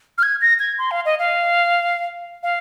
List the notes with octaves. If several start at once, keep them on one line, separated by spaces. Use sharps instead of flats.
F6
G#6
A#6
G#6
C6
F5
D#5
F5
F5